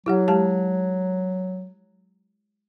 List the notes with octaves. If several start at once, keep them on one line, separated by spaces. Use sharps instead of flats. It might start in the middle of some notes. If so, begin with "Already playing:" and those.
F#3 E4 G4 F#5
G#3 G4 A5